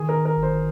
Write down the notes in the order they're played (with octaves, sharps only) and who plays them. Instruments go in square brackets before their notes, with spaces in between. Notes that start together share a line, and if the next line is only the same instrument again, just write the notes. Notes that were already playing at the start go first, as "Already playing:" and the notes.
Already playing: [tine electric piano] D#3 [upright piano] G#4
[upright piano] A#4
[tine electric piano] D#3
[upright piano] A#4
[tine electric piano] G1
[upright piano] C5